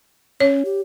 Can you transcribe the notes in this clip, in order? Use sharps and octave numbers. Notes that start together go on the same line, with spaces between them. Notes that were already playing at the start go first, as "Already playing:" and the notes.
C#4 C#5
G4